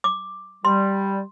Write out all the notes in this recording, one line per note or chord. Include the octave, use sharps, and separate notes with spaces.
D6
G3 C6